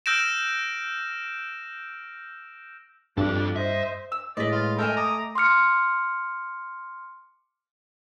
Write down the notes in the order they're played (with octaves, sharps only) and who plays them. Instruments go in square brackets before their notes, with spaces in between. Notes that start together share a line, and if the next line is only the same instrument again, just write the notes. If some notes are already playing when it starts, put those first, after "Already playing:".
[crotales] E6 F6 G6 A#6 D7 E7
[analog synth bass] G2 [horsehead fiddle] D4 [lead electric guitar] F4 A4
[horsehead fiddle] C5 D#5 [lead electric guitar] E5
[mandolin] E6
[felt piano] A2 G#3 [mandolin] B4 D#5 [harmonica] D5
[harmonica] F4
[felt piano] A3 E7 [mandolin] A4 D#5 G#5 [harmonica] A#4 G5
[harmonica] A#5 D6 D#6
[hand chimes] C6 D6 F6 C#7